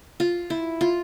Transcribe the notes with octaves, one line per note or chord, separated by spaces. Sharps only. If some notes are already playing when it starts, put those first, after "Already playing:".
F4
E4
F4